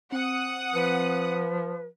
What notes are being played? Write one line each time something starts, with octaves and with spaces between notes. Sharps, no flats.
C4 F#5 D#6
F3 B4